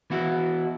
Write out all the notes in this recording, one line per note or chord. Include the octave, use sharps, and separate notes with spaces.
E3 B3 E4 F#4